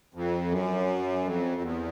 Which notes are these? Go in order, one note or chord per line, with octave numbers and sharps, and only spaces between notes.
F2
F#2
F2
E2